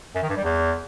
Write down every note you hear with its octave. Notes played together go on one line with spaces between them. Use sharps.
F#2
D#3
G2
G3
E2